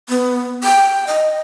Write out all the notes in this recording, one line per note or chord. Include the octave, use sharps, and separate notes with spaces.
B3
G5
D#5